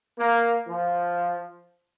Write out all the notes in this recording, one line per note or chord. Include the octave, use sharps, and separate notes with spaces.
A#3
F3